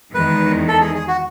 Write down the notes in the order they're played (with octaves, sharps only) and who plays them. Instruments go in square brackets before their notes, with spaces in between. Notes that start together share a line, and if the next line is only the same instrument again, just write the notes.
[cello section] E2 D#3 G#3 [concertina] B4
[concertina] A4
G#4
G#4
F#4